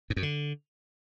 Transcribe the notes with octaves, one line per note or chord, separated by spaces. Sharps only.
G#2
F#2
D3